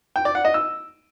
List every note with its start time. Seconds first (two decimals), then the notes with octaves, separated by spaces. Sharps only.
0.16 G5
0.25 D5
0.35 F#5
0.45 D#5
0.54 E6